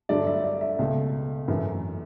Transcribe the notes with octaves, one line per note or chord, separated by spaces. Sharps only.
G2 D3 F#3 A3 D5
E5
D5
E5
C#2 B2 A3
F#2 E3 A3